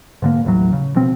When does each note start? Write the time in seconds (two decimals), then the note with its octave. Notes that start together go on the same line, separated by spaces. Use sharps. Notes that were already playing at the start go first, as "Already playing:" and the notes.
0.22 G#2 D3 A#3
0.45 A1 D#2 A2 F#3
0.73 C#3
0.95 B2 F3 C4